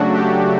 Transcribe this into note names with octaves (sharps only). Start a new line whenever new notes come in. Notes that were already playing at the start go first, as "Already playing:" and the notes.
Already playing: C#3 F#3 A3 D4 F#4
G4